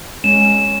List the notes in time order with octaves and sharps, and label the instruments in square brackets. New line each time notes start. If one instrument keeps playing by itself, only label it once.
[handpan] G#3 C#4 [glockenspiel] E7